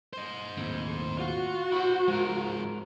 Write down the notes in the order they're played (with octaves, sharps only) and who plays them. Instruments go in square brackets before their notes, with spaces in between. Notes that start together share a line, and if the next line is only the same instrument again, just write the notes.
[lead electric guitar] C5 D#5
[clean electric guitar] D#2 A2 C4
[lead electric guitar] F4 [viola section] F#4
[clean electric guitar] E4 G4 F#5 [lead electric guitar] C5 B5
[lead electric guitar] G#2 F3 [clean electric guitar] G#3 A#4